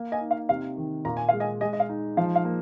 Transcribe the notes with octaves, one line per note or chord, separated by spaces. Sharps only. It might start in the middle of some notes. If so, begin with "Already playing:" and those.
Already playing: A#3
D#5 G#5
D#4
F5
C3 F5
D#3
A#2 A#5
G#5
G#3 F5
D#5 G#5
G#3 D#5 G#5
D#5
F5
D#4
F3 F5
F5
A#3